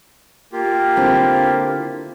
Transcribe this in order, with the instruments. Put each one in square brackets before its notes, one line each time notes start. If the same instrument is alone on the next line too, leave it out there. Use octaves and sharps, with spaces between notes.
[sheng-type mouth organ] A#3 F4 G4
[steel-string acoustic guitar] D3 C4 E4